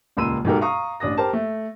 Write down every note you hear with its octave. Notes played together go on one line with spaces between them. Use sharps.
D#1 C#2 A#3 C6 E6 D#7
G#2 B2 D#4 G4 A4 A#4
F5 A#5 C#6 D#6
A1 D4 D#6 A#6
G4 A#4 C5 A5
A3